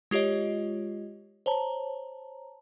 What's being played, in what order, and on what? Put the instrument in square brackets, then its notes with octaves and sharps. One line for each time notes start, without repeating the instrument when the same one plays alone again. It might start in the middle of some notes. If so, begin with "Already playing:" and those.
[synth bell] G#3 F4 G4 C#5 D#5
C5 C#5 A5 A#5